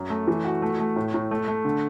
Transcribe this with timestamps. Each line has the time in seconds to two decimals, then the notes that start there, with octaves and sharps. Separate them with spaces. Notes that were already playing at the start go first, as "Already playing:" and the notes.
Already playing: F#2
0.10 A3
0.27 E3
0.45 F#4
0.62 A3
0.79 A3
0.96 A2
1.14 A2
1.31 A3
1.48 A3
1.65 D3